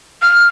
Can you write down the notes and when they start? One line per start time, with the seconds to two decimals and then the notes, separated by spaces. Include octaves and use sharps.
0.22 F6